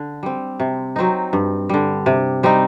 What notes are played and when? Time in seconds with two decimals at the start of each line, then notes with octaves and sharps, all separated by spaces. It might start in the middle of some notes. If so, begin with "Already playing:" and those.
Already playing: D3
0.23 G3 C4
0.60 C3
0.96 F#3 C4 D#4
1.33 G2
1.69 D3 G3
2.06 C3
2.43 G3 C4 D#4